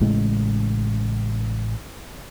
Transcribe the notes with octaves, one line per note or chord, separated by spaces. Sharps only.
A1 A2 C#3 G#3